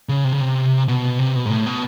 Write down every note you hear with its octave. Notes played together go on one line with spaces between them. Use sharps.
C#3
C3
C#3
C3
B2
C3
B2
G#2
A2
B2